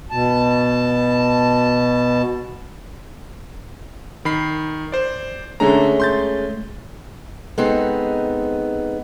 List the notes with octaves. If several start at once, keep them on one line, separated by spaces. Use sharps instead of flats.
B2 A5
D#3 B5 C7
C5 D5
D3 G#3 A3 C#4 A#5
C6 G6 A6
G#3 B3 C4 D#4 G#4 A4